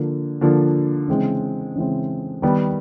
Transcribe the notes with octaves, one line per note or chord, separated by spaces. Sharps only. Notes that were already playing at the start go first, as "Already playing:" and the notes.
Already playing: D3 F3 A#3 D4
D3 F3 A#3 D4
C#3 E3 G#3 C4
C#3 E3 G#3 C4
D#3 G3 B3